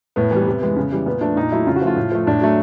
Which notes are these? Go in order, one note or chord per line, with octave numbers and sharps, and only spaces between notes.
A2 B3
E3 G3 B3
C3
E3 G#3
C#3
E3 G3
A#2 B3
F3 A3 D4
A#2 D#4
F#3 A3 E4
C#3 F4
F#4
F3 A3 F4
A2
F3 A3
A2 D4
F#3 A3